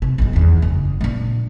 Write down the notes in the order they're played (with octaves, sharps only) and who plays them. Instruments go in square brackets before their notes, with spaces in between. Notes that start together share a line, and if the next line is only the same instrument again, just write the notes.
[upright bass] C3
B1 G2
E2 D#3
F#1 C#3
A#2 D4